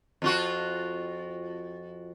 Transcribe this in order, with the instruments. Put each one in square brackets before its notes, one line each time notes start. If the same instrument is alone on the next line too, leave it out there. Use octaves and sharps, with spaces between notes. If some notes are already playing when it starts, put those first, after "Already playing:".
[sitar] F2 F4 F#4